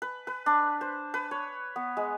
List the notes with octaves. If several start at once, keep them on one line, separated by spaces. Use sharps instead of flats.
B4
B4
D4
C5
B4
C#5
B3
G#3